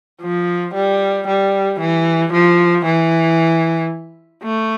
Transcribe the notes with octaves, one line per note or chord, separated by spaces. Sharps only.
F3
G3
G3
E3
F3
E3
A3